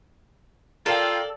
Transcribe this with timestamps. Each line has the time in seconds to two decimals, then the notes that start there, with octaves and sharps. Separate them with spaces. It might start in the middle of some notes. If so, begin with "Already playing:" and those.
0.86 F4 A4 A#4 D5 F5 G5